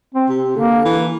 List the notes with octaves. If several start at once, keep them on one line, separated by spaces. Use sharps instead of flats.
C4
C3
D3 A#3
E3